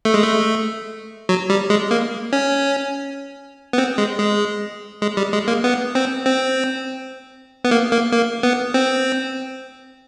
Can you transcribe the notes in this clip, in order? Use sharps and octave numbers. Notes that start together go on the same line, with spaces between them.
A3
G#3
A3
F#3
G3
G#3
A#3
C#4
B3
C4
G#3
G#3
G#3
G3
G#3
A#3
B3
C4
C4
B3
A#3
A#3
A#3
B3
C4